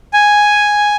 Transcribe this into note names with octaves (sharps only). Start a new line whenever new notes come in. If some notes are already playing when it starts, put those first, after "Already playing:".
G#5